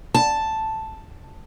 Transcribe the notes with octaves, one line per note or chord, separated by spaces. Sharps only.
A5